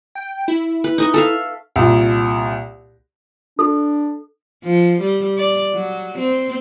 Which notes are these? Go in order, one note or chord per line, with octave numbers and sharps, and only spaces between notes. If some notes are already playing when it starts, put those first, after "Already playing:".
G5
E4
B4
D#4 D#5 C#6
A4 E5 F5
C2 A#2
D4 A4
F3
G3
D5
F#3
C4